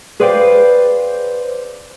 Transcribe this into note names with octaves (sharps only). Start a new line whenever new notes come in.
G#4 B4 C5 D5 F5 G5